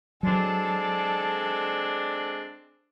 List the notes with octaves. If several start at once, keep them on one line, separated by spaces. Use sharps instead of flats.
F#3 G#3 C4 D4 A4